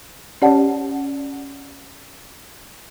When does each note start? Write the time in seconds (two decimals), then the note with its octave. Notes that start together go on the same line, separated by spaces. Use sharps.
0.42 C#4 G4 C#5 D5 F#5 A5